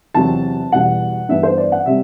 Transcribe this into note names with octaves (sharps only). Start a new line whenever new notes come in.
E2 C3 F#3 C4 A5
E2 B2 G3 F#5
G2 E3 B3 D4 E5
C5
D5
F#5
C3 G3 C4 E5